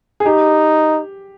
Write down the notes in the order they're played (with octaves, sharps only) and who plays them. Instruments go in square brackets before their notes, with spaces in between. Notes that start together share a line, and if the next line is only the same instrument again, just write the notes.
[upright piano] G#4
[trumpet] D#4 [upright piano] G4